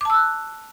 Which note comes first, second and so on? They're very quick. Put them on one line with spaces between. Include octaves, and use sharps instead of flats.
D6 A5 E6 F#6